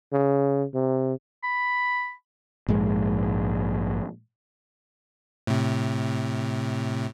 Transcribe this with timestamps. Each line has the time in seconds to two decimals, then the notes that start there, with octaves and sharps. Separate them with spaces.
0.13 C#3
0.74 C3
1.44 B5
2.68 A#1 G#2 G#3
5.47 A2 C3